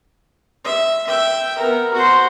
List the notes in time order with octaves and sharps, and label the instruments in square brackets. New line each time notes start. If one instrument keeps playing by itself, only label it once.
[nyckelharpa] E5
E5 G5
B3 A#4
F#4 C5